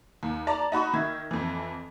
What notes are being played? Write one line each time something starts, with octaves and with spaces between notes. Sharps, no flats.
D#2
D5 A5 A#5
D#4 F#4 B5 C#6
D#3 E5 G#6
F2 E3